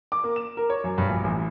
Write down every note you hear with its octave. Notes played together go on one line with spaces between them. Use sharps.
D6
A#3
E7
A#4
C#5
F#2
G2
A#1
A1